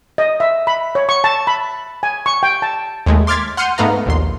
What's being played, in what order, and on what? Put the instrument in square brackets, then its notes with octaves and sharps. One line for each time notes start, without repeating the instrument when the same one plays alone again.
[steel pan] D#5
E5
B5
C#5
C#6
A5
B5
G#5
C#6
G5
A5
[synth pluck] D#2 G#3 A3
C6 D6 F6 G#6 A6 B6
F#5 C6 F6 G6 C#7 D#7
G#2 A3 B3 F5 A#5
A#1 D#2 C6